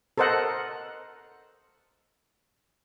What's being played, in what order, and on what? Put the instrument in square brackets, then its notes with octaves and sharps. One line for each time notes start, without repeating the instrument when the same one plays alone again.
[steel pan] A4 A#4 C5 D#5 F#5